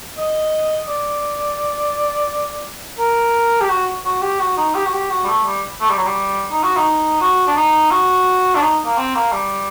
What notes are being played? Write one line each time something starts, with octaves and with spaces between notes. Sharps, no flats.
D#5
D5
A#4
G4
F#4
F#4
G4
F#4
D#4
G4
F#4
G4
F#4
G3
A3
G3
A3
G3
F#3
G3
D#4
F#4
D#4
F#4
D4
D#4
F#4
D4
D#4
A#3
C4
A#3
G3